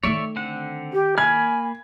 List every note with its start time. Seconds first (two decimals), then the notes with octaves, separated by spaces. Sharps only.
0.03 D#3 A3 C#5 D5 E5
0.36 D3 C4 F#5
0.93 G4
1.18 A#3 G#5 B5 F6 G#6